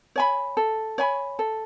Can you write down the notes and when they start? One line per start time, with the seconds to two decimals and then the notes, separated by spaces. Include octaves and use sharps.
0.16 C#5 G#5 B5
0.57 A4
0.98 C#5 G#5 B5
1.39 A4